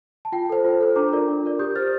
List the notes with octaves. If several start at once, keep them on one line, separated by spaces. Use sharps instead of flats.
A5
F4 G5
A4 C5
F4
A4 C5
D4 A#5 D6
F4 A#4 D5
D4
F4 A#4 D5
G4 D#6 G6
C5 F6 A6